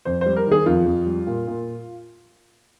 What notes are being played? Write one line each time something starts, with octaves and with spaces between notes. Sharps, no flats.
F2 C5
G3 C5
A#4
D#3 G#4
F2 F4
F2
G3
A#2
A#2